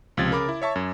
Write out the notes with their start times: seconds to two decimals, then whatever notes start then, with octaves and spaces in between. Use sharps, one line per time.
0.17 C#2 C3 F3 G#6 A6
0.31 C#3 A#4 B5 D6
0.49 E4
0.62 C#5 E5 A5 C#6
0.76 F#2